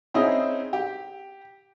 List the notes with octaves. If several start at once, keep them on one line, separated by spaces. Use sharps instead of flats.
C4 C#4 D#4 E4 G#4
G4